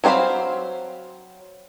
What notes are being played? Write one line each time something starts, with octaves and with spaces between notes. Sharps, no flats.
F#3 C4 C5 F5 B5